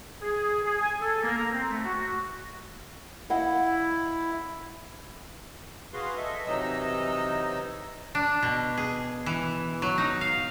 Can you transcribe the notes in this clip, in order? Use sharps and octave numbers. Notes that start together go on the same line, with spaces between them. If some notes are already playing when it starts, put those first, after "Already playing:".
G#4
G#4
G#5
A4
A#3
A#5
C4
A3
F#4
E4 D#5 F5 F#5
F#4 G#4 B4 F5 C6
A4 D#5 E5
C3 E3 F#3 D#4 D#5 E6
D4
B2
G#4
E3
F#3
D#4
F5